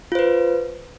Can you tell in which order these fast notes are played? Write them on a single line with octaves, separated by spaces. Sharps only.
F4 C5 B4